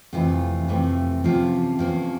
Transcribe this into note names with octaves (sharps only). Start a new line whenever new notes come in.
F2 C3 E3 A3 F4
F2 C3 E3 A3
E2 C3 F3 A#3 C#4 F4
E2 C3 F3 A#3 C#4